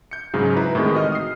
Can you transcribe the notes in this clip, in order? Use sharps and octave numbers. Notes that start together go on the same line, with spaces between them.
G6 C#7
G#2 C#3 F#3
E4 B4 A#5
A2 C3 D#3 E3 G#3
F#4 D#5 F6
D#6 C7